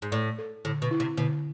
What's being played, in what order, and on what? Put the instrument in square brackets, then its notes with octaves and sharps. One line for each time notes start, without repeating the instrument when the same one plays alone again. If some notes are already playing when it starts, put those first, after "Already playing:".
[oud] G#2
[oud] A2 [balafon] D5
[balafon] A4
[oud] A2 [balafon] D3
[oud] B2
[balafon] E4
[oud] C3
[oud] B2 [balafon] D3